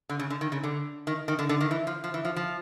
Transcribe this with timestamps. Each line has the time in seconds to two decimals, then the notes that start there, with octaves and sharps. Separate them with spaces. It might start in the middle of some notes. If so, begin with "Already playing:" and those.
0.09 D3
0.19 C#3
0.30 D3
0.41 D#3
0.52 C#3
0.63 D3
1.07 D#3
1.28 D#3
1.39 D3
1.49 D3
1.61 D#3
1.71 E3
1.87 F3
2.04 F3
2.14 E3
2.25 F3
2.36 F3